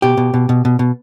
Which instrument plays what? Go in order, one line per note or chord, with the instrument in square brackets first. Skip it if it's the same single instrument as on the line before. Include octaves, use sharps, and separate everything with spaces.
[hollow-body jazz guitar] B2 G4
B2
B2
B2
B2
B2